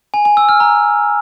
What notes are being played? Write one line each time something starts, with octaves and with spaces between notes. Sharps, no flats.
G#5
G#5
E6
F6
A#5